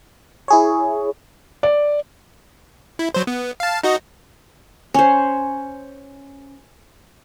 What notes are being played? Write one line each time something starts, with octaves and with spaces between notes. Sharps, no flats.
E4 G#4 C#5
D5
E4
F#3 C5
B3
F5 A5
D#4 F#4 D#5
C#4 C5